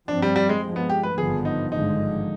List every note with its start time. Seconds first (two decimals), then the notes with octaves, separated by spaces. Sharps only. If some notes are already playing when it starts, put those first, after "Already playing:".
0.08 G2 F3 C4 D4
0.22 G3
0.36 G3
0.49 G#3
0.62 G2 F3 G#3
0.76 B3
0.90 G4
1.03 B4
1.18 G#1 G2 D3 F3 B3 G#4
1.45 D#4
1.71 G#1 G2 D3 F3 G#3 D#4